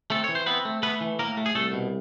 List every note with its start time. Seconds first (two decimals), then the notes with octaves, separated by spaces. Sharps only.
0.10 A3 C4 A4
0.24 E3 C#5
0.35 C5
0.46 B3 C4 B4
0.65 A3
0.83 A3 B3 B4
1.01 E3
1.19 A2 A#3 A#4
1.37 A3
1.46 G#4
1.55 C2 A3 A4
1.73 B2